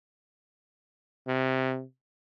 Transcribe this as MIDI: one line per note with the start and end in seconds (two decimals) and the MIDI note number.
1.27 1.83 48